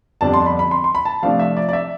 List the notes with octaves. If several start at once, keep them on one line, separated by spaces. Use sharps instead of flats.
F2 D3 G3 B3 D4 A5
C6
B5
B5
C6
C6
B5
A5
C3 F3 A3 D4 F5
E5
D5
D5
E5